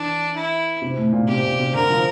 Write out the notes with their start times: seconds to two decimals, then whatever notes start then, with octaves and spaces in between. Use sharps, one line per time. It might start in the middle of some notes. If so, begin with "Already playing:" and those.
Already playing: E3 D4
0.36 E4
0.82 C3
0.97 A2
1.13 A#2
1.28 C3 G4
1.43 A#2
1.59 C3
1.74 D3 A#4
1.90 F3